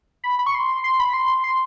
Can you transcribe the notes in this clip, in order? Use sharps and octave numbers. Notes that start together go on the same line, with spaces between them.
B5
B5
C#6
C6
C6
B5
C6
C6